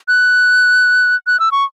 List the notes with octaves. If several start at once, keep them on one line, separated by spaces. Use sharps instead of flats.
F#6
F#6
E6
C#6